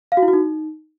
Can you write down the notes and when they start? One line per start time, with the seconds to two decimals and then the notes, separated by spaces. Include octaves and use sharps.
0.12 F5
0.17 F#4
0.23 E4
0.28 F#4
0.33 D#4